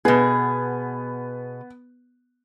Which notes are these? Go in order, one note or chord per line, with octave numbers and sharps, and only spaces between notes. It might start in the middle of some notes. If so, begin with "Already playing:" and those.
B2 B3 G#4